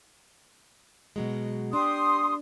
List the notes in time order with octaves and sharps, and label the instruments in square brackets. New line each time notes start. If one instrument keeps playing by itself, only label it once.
[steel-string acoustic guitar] B2 F#3 G#3
[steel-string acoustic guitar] D4 [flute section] G4 C6 D#6